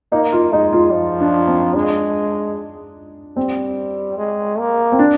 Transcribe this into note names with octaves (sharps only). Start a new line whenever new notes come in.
A#3 D#4
F4
G#3 D#4
F4
F3
D4
C4
G#3 D4
G3 C4
G#3
A#3
C4
D4